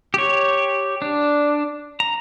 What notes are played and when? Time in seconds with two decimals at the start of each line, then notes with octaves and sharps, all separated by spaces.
0.14 G4 C#5
1.02 D4
2.00 A#5